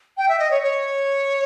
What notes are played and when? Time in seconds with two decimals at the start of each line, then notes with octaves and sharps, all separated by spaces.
0.17 G5
0.29 E5
0.39 D#5
0.51 C#5
0.63 C#5